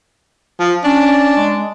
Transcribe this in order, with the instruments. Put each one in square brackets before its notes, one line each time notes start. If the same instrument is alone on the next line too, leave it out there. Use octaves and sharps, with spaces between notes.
[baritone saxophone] F3
[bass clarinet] C#4 [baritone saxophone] D4
[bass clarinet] G#3